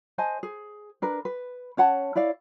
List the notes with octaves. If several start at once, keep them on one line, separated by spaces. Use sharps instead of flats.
C5 D#5 G#5 A5
G#4
D4 A#4 B4
B4
C#4 C#5 F#5 A5
E4 C#5 D5 F5